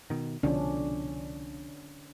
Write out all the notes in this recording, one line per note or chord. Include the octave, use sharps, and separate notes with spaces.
B2 D#3
C2 B2 D3 F3 C#4 D4